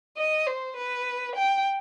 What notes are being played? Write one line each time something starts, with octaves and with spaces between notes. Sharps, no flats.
D#5
C5
B4
G5